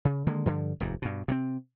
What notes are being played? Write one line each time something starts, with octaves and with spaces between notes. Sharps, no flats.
C#3
D3 D#3 G#3 A#3
G2 D3 F3
F1 D#2 G#2
G2 B2
C3 F#3 C4